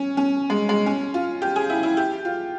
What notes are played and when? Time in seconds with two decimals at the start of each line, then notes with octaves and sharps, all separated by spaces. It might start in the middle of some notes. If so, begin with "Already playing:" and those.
Already playing: C#4
0.17 C#4
0.50 G#3
0.69 G#3
0.86 C#4
1.14 F4
1.42 G4
1.56 G#4
1.70 E4
1.83 E4
1.97 G4
2.25 F4